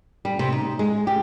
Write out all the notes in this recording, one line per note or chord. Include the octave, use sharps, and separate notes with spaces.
G3
C3
D#4
G#3
G4